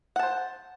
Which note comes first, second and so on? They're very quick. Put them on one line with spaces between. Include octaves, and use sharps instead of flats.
F#5 A5 C5